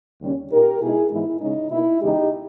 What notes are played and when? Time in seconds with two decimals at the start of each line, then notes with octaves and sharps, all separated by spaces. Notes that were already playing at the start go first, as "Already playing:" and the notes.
0.21 D#2 C#3 G3 C#4
0.51 A#2 A#3 D#4 G4 A#4
0.81 B2 G#3 D#4 E4 G#4
1.11 G#2 E3 G#3 B3 D#4 E4
1.41 C#3 G#3 C#4 D#4
1.71 B2 A#3 D#4 E4
2.01 E2 C#3 G#3 D#4 G4